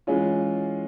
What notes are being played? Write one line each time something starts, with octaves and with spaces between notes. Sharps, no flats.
E3 G#3 C#4 F4